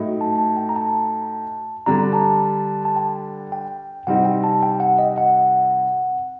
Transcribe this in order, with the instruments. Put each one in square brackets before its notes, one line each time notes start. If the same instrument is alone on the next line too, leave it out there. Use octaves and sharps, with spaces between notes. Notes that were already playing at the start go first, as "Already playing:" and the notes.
Already playing: [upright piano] A2 F#3 A3 D#4
[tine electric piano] A5
A5
G5
A#5
A5
[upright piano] D3 G3 D4 [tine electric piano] A#5
[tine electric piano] A5
A5
G5
G5
[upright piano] C3 G3 C4 D#4 [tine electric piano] F#5
[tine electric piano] G5
A5
G5
F#5
D#5
F#5